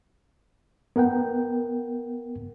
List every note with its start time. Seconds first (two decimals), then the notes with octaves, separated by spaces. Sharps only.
0.96 B3 A#4 F#5 G5